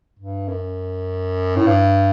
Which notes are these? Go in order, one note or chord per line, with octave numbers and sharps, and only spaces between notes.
G2
F#2
A2
G2